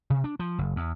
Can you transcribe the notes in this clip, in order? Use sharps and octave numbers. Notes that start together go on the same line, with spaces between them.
C3
D4
F3
F#1
E2